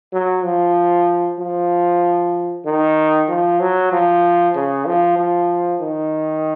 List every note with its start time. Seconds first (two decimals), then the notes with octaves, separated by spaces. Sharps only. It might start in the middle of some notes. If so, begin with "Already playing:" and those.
0.13 F#3
0.44 F3
1.39 F3
2.65 D#3
3.29 F3
3.60 F#3
3.92 F3
4.55 C#3
4.87 F3
5.18 F3
5.81 D#3